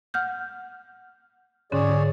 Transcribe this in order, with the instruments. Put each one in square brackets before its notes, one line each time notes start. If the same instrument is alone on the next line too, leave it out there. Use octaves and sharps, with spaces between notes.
[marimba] F#5 F6 G6
[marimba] G#2 D3 C#4 [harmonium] G#4 C#5 D5